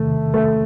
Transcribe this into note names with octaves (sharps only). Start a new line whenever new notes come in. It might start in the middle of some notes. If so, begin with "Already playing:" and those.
Already playing: E2 C3 D#3 A3
A3